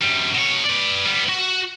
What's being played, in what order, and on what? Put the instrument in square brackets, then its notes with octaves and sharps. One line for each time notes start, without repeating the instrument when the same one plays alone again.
[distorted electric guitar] F#2 G3
B2 C#5
B4 D5
G3 B3
F#4